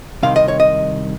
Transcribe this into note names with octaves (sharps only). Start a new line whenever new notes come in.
C2 C3 D#3 F5
D#5
C#5
D#5